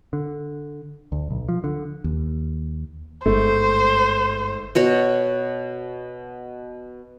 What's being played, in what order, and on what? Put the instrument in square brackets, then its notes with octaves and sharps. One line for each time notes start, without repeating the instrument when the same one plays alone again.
[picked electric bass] D3
D2
B1
F3
D3
[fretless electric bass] D#2
[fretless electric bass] G1 [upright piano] G#2 A3 [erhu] C5
[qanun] B2 F#4 C#5